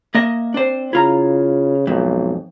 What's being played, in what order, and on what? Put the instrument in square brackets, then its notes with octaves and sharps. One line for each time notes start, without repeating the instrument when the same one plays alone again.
[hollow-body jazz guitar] A#3 D#5 E5
[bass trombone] C4 [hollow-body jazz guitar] D4 C5
[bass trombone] C#3 [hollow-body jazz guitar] E4 F4 A#5
[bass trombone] B1 [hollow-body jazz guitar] F2 G#2